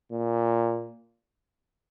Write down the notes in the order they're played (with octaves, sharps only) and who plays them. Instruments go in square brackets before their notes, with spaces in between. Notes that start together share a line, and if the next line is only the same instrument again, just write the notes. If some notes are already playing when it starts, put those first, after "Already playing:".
[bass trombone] A#2